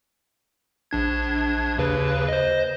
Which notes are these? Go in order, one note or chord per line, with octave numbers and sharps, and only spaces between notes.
A#1 D4 G#6
D#2 C#3 B4
C5 D#5